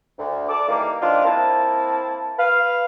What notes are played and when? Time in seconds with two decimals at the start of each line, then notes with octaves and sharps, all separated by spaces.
0.18 D2
0.49 A4 D5 D6
0.68 D#3 E3 G3 A#3
1.01 D#3 F3 G3 D4 F4
1.25 A#3 C4 E4 A5
2.38 B4 F5